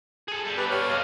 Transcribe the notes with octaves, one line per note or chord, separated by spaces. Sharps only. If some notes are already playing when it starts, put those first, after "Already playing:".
G#4 A4
G3 A4
G4 B4
C#5 F6
F4 D#5